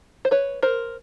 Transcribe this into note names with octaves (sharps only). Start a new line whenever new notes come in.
C5
B4 C#5
A#4 C5